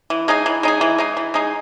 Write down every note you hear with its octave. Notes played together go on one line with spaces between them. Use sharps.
E3
G#3 D#4 G#4
E3
G#3 D#4 G#4
E3
G#3 D#4 G#4
E3
G#3 D#4 G#4